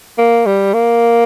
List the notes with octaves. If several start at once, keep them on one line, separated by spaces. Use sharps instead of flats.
A#3
G3
A#3